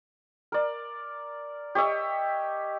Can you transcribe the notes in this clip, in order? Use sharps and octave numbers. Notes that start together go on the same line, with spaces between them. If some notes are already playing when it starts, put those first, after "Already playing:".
A#4 D5
G4 C#5 D#5 E5